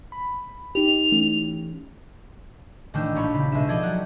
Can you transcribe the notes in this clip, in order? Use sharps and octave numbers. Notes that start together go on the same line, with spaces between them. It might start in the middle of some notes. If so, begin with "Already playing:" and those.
B5
D#4 G4 F7
E3 A3 C#4
A1 D#3 A3 D4 G5 E6
A#1 G4 C#5 B5
C#3
B2 G#3 C4 E5 E7
F3 A4 D5 D#5 G#6
F#3 G4 F#5